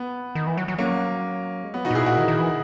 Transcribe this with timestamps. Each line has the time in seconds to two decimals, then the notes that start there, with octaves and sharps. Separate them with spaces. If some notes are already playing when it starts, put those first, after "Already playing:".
Already playing: B3
0.35 D#3
0.47 E3
0.57 F#3
0.68 F#3
0.78 F#3 A#3 C#4
1.64 G#3
1.74 F#3 B3
1.85 C#3 D#4 F#4
1.90 A#2
1.95 B2 E4 G#4
2.06 A#2 F#4 A#4
2.18 D#3
2.28 D#3
2.38 E3